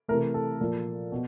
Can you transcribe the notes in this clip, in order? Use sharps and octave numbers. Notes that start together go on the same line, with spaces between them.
C3 E3 A3 A#4
A4
A#2 F3 A#3
B2